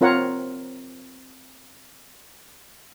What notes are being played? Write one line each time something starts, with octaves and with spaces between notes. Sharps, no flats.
C4 F4 A#4 C#5 F#5